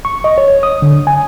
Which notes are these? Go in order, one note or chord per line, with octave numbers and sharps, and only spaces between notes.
C#6
D#5
C#5
D#6
D3
G#5